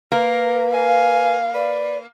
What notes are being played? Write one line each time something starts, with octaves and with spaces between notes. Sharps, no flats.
A#3 A#4 B4
F5 G#5
B4 D5